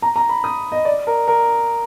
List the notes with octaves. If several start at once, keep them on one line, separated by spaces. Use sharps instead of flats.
A#5
A#5
B5
D#6
D#5
D5
A#4
A#4